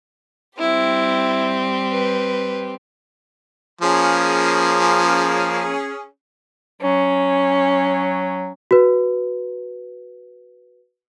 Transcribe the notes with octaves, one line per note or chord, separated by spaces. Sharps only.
G3 C4 E4 G4
B4
F3 A#3 C#4 G#4
F#3 C#4
F#4 B4